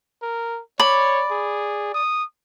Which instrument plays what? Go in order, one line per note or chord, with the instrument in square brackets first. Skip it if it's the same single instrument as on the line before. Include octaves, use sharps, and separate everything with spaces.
[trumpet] A#4
[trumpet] C#5 [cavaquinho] D5 B5
[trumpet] G#4
D#6